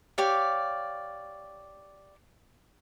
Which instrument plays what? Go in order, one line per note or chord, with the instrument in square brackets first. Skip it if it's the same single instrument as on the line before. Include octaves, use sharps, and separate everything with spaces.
[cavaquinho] G4 C#5 D5 F5